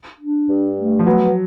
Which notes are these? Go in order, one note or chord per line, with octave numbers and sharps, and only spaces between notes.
D4
G2
A3
F3
F#3 B3